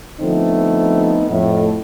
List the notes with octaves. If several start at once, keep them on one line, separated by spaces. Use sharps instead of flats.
D3 F3 A3 B3 C4 D#4
F2 A2